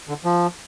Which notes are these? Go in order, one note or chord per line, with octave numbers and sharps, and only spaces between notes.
D3
F3